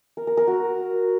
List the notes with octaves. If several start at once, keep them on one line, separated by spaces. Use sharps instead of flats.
A#4
A#4
A#4
F#4